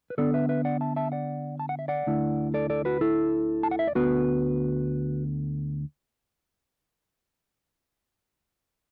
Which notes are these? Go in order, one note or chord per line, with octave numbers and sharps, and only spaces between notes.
B4
D3 B3 D4 A4 D5
B4 E5
B4 E5
D5 F#5
E5 A5
E5 A5
D5 F#5
A5
F#5
E5
D5 F#5
D2 D3 A3 E4
A4 D5
A4 D5
F#4 B4
E4 A4
A5
F#5
E5
D5
D2 D3 B3 F#4 B4